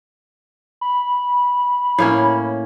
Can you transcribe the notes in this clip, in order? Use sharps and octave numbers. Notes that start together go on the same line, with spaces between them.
B5
A2 A#3 C#4